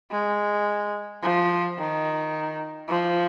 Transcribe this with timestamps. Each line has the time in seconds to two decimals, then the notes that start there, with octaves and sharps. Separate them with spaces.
0.12 G#3
1.23 F3
1.78 D#3
2.89 F3